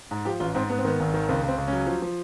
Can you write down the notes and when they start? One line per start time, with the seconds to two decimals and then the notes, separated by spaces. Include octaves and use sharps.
0.11 G#2
0.25 F3 G4
0.40 A1 F4
0.55 G#2 C4
0.69 G#2 B3
0.79 C4
0.85 D#3 B3
1.00 G#1
1.14 D#3
1.28 C#2 C4
1.44 C#2 C4
1.58 C#2
1.68 F#3 C#4
1.87 F3
2.02 F3